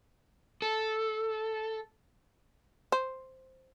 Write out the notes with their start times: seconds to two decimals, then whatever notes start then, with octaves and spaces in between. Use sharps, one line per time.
0.62 A4
2.92 C5